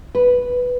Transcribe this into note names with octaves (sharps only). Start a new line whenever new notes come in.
B4